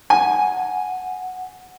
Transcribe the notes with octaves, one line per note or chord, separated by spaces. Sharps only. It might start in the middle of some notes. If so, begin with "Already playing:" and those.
F#5 G#5